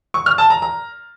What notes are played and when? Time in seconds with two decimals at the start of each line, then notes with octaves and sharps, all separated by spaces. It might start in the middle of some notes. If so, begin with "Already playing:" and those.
0.14 C#6
0.26 F6
0.38 A5
0.50 A#5
0.62 A#5